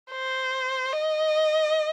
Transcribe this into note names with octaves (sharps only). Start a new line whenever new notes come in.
C5
D#5